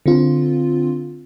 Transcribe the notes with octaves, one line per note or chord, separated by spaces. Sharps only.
D3 C4 F4